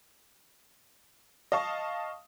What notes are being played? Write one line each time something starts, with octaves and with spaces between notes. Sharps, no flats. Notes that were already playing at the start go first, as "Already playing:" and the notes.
D#5 F5 A5 C#6